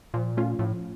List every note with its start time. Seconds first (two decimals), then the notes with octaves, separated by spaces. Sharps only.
0.14 A#2 F3
0.37 A3 C#4 F4
0.59 A2 F3